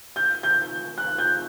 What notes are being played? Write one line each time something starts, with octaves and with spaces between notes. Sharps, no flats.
G6
G6
F#6
G6